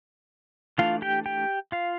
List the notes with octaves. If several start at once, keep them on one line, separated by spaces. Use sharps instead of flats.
E3 A3 D4 F4 F5
G4 G5
G4 G5
F4 F5